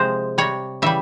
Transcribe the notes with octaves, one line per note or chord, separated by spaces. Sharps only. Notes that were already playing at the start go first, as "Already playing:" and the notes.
Already playing: C3 F3 G#3 G#4 C5
C3 G3 C#5
C#3 E3 G3 E5